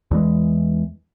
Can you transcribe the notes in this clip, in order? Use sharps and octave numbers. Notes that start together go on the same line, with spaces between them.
E2 E3 G#3